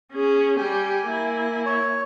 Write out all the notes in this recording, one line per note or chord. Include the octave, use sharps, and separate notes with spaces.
C#4 G#4
G3 G4 G#5
A#3 E4
C#5